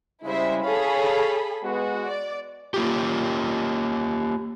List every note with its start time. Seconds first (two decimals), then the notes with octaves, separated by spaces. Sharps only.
0.24 C#3 G3 G#3 E4 C5 E5
0.63 G#4 A4 C#5 F5 B5
1.64 G#3 B3 F#4
2.06 D5
2.74 A#3 F4 G4